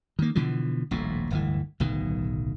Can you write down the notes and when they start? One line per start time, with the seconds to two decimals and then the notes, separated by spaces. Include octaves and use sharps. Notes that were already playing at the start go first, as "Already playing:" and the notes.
0.19 D#3 A#3
0.35 B2 D3 E3 F3
0.91 D#1 A#1 A2
1.31 D1 G1 E3
1.80 D1 B1 B2 D#3